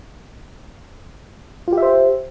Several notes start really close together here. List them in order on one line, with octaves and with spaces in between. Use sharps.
F4 G4 E5 C5